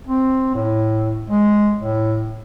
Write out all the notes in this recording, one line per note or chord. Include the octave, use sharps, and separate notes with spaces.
C4
A2
G#3
A2